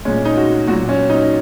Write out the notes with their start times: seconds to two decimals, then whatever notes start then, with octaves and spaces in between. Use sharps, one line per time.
0.05 A#2 G#3 C#4
0.25 D#4
0.37 F#4
0.67 A#2 F#3 F#4
0.89 C#4
1.09 D#4